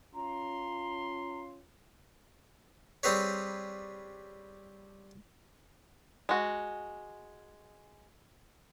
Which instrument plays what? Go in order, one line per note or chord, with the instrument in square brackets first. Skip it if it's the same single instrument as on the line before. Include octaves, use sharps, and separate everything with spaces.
[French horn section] C#4 F4 [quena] A#5 [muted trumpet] C6
[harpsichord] G3 C4 G#4 B4 C#5
[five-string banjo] G#3 F#4